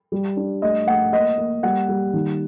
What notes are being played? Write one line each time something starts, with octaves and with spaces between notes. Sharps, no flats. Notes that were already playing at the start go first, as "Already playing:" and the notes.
G3
D4
A3 D#5
A3 F#5
A#3 D#5
A#3
G3 F#5
G3
D#3